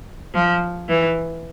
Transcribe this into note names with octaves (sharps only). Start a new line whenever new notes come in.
F3
E3